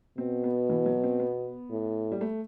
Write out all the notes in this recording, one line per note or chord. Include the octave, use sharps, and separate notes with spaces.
B2 C4
B3
E3
F#3
C4
B3
A2
G3
A3